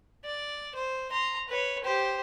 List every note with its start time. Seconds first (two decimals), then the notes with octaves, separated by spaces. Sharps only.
0.25 D5
0.75 C5
1.11 A#5 C6
1.49 B4 C#5
1.84 G4 C5